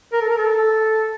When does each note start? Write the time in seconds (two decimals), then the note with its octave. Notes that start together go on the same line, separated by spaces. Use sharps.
0.13 A#4
0.21 A4
0.30 A#4
0.38 A4